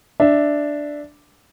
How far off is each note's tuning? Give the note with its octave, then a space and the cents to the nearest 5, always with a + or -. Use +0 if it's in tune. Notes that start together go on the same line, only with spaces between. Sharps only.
D4 +0 E5 +0